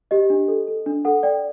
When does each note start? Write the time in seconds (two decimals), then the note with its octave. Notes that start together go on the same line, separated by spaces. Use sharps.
0.11 G4 D#5
0.30 D4
0.48 A4
0.67 A4
0.86 D4
1.05 A4 F#5
1.23 D5 G5